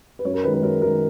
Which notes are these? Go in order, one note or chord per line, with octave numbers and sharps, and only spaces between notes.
B4
F#2 C#5
A#4
D#3 G#3 B4
B4
F#2 A#4
D#3 G#3 A#4